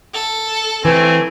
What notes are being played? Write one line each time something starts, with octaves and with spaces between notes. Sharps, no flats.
A4
E3 A3 C4 G#5